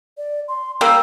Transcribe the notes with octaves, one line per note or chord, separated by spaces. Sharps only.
D5
C6
G3 A#3 E6